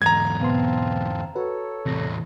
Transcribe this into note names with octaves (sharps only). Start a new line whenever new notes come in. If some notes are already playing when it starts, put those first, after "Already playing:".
E2 G#2 D3 A#5 G#6
B2 B3 C4 F5 A5 C6
F#4 A4 B4 C#5
E2 A2 C3 A#6